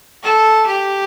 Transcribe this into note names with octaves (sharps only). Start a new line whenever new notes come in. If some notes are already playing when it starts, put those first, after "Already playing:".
A4
G4